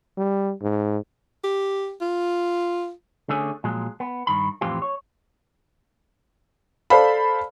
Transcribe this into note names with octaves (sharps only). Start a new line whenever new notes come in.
G3
G#2
G4
F4
D3 A3 C#4 G#4
A#2 F3 F#3 G#3
B3
G2 D#3 B5
F2 A2 E3 C4 F4 G4
C#5
A4 C5 D5 F5 A5 B5